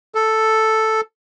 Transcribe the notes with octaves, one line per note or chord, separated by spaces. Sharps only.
A4